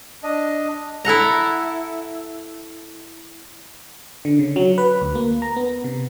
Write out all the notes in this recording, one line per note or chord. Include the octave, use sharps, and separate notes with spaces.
D4 D#5
E4 A4 F#5 A#5
D3
C#3
F#3
B4
D2
A#3
A#5
B3
C3